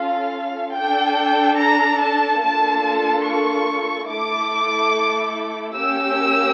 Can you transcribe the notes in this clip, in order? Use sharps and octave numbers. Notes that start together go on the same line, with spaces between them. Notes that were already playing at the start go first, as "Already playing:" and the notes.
Already playing: C#4 F4 A4 F5
D4 A4 G5
A#5
A5
A#3 D4 F4 A4 A5
C#6
A3 E4 A4 D6
A#3 C#4 G4 E6